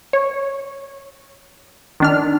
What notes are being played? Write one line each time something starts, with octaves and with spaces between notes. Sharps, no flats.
C#5
D#3 D4 F6